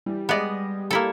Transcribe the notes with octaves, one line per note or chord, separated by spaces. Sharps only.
E3 G3
G#3 B3 D5 D#5 F#5
A#3 E4 G4 A4